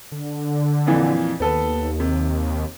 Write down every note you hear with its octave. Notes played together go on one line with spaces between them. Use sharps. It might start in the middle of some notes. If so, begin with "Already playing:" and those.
D3
F2 A#2 E3
D#2 B3 A4 B4
C3